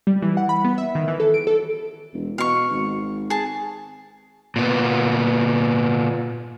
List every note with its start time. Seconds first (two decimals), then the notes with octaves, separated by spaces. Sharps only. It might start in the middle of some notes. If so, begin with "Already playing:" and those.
0.07 G3
0.22 E3
0.37 F#5
0.49 B5
0.65 B3
0.78 E5
0.95 D#3
1.08 E3
1.20 A4
1.34 D7
1.47 A4
2.13 E1
2.38 B2 F5 C#6
2.71 G#1
3.30 G#4 A5
4.56 A#2 B3